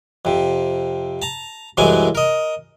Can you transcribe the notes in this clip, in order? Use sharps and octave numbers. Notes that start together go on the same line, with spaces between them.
F2 C3
A5 A#5
C2 F#2 E3 F#3 G#3 G#5
A#4 D#5